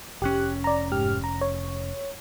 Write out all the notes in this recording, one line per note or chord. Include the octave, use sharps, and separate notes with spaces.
F1 C#4 G4 F#6
D5 A#5
G#2 G4 F6
A#5
C#5